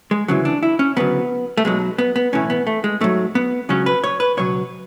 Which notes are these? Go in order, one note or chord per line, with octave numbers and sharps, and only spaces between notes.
G#3
D2 C#3 E3 F#3
D4
E4
C#4
D2 C#3 F#3 B3
A3
B1 B2 F#3 G#3
B3
B3
B1 A2 E3 C#4
B3
A3
G#3
G#2 F#3 A3
B3
C#2 C#3 F#3 C#4
B4
C#5
B4
C#2 B2 F#3 C#5